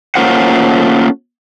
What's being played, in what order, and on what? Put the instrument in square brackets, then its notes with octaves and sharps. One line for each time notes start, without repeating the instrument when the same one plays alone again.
[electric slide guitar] A3 A#3 C#4 F4 C5 F#5